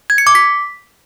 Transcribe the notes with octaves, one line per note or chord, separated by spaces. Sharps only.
G#6
C#7
D6
B6